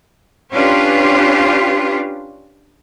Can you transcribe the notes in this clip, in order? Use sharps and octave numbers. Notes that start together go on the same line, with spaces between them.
C#4 D4 F4 G4 B4